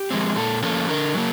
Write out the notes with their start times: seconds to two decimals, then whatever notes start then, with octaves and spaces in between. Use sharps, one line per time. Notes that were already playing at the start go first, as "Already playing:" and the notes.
Already playing: G4
0.11 F3 G#3 C4
0.36 A#2 A4
0.62 F3 A#3 C#4 A4
0.89 D3 A#4
1.14 F#3 A#3